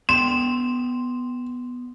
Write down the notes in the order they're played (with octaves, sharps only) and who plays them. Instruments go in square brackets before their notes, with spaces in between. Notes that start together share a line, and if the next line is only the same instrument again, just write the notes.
[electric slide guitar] B3 D5 G5 [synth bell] C6 [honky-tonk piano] E7